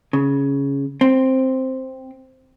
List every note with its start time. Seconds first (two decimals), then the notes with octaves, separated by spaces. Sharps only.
0.13 C#3
1.01 C4